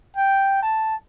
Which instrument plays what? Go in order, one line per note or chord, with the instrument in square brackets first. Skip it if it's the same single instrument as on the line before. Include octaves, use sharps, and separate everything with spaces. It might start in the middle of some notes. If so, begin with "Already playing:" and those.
[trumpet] G5
A5